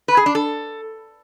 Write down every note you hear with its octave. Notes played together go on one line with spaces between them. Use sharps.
B4
G#4
D4
A4